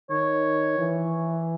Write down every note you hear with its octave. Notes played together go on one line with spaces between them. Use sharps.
D#3 C#5
E3